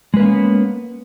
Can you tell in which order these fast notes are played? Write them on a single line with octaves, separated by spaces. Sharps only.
G#3 B4 A#3 C#4 B3